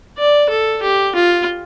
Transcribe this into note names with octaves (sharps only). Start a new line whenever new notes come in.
D5
A4
G4
F4